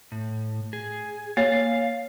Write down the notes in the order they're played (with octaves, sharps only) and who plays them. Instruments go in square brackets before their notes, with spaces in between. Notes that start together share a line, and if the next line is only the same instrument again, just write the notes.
[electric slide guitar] A2
G#4
[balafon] A#3 C#5 [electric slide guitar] F5